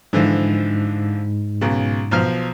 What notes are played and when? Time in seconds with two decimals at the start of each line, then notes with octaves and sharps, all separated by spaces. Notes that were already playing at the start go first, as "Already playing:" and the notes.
0.13 G#2 D3 E3 F3
1.61 B1 C#3
2.11 B1 F3 F6